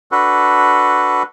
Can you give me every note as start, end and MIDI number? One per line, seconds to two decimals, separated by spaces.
0.11 1.23 62
0.11 1.23 66
0.11 1.23 69
0.11 1.23 71